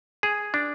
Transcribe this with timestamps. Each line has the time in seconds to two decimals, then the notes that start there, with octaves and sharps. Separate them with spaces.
0.23 G#4
0.54 D4